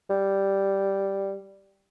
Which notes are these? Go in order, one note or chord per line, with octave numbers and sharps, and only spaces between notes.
G3